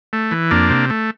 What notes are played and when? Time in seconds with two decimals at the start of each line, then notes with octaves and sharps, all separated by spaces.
0.13 A3
0.31 E3
0.51 F2 A#3 D4
0.70 C3
0.90 A3